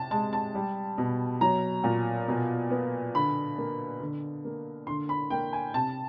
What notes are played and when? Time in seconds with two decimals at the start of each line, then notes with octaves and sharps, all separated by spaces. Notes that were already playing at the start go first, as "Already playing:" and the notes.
Already playing: C3 A5
0.11 G#3 A5
0.33 A5
0.55 G3
0.98 B2
1.41 F#3 A#5
1.84 A#2
2.28 B2
2.70 B3
3.14 D3 B5
3.58 A#3
4.00 D3
4.44 A#3
4.87 D3 C6
5.09 B5
5.30 A#3 G5
5.53 G#5
5.74 C3 A5